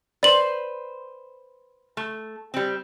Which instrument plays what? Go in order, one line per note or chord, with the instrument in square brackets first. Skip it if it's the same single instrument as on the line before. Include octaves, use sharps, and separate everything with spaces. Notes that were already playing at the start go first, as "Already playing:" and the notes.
[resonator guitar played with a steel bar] B4 C5 [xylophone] D5 F#7
[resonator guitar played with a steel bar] A3
G3 C4